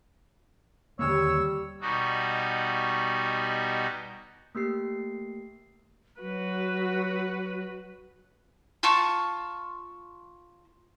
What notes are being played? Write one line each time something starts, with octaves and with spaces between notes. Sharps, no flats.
D#2 D3 G3 A#3 C#5 E6
B2 G3 D#4 F#4
A3 A#3 G4 C7
F#3 F#4 B4
F4 A5 C#6